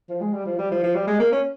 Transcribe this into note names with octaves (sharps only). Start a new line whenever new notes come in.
F3
G#3
G3
F3
G3
F3
F3
G3
G#3
A#3
C#4